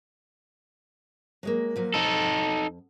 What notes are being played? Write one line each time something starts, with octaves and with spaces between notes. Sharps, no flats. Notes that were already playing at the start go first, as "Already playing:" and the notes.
F#3 G#3 A#3
F3 F#3 A#3
F2 D#4 A4